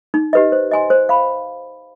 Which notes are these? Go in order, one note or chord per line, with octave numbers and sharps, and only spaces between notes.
D#4
G4 B4 D#5
C5
D#5 G#5 C6
C5
F5 B5